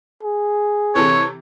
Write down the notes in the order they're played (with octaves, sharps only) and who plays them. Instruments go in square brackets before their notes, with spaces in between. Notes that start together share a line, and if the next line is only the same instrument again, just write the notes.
[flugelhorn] G#4
[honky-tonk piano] C3 E3 A4 [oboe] C#5